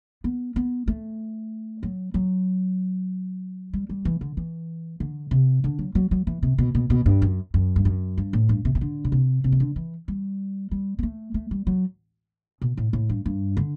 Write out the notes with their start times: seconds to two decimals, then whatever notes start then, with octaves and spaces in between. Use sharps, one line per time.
0.24 B3
0.56 B3
0.88 A3
1.83 F#3
2.14 F#3
3.73 G3
3.89 G3
4.05 E3
4.21 D3
4.37 E3
5.00 D3
5.31 C3
5.64 D3
5.79 F#3
5.95 F#3
6.11 F#3
6.27 E3
6.43 C3
6.58 B2
6.75 B2
6.90 B2
7.06 G2
7.22 F#2
7.54 F#2
7.76 G2
7.85 F#2
8.18 G2
8.33 A2
8.49 G2
8.65 C3
8.75 C3
8.81 D3
9.05 B2
9.12 C3
9.44 C3
9.52 E3
9.60 D3
9.76 E3
10.08 G3
10.71 G3
10.99 B3
11.03 A3
11.34 A3
11.51 G3
11.67 F#3
12.61 B2
12.77 A2
12.93 A2
13.09 G2
13.26 G2
13.57 D3